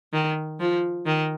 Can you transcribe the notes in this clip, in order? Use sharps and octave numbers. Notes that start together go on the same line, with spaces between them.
D#3
F3
D#3